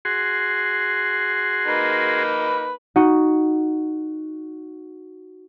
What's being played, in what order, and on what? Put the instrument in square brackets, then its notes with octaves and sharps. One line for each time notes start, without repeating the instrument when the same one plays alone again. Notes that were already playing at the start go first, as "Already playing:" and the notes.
[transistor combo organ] F#4 G#4 C6
[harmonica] A#3 D#4 B4
[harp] D#4 F#4 F#5